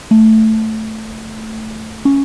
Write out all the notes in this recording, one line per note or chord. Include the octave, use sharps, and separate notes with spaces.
A3
C#4